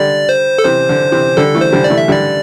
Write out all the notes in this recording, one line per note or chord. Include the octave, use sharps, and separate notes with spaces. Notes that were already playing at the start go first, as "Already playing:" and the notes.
Already playing: D3 G3 D5
C5
A4
C3 E3 C5
D3
C3 E3
D3 G3 A4
E3 A3
C5
D3 G3
D5
E3 A3
E5
D3 G3 D5